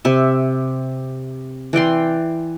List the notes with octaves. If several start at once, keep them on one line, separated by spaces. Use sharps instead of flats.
C3 E5
E3 D5 G5 C6